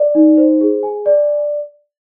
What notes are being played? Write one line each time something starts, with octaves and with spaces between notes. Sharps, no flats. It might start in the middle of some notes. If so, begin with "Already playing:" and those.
Already playing: D5
D#4
C5
G#4
G#5
D5